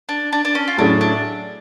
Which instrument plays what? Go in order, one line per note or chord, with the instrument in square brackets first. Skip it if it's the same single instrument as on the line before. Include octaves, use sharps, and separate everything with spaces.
[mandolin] D4
D4
D4
C#4
F4
[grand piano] A2 F#3 A3 C#4 G#4 [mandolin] D4
[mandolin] D4